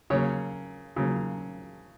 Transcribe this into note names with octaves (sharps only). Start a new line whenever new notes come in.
C#3 F#3 A#3 C#5
C#3 F#3 A#3